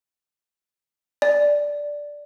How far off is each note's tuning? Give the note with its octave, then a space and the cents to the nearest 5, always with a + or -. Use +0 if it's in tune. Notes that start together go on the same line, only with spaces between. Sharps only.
D5 -5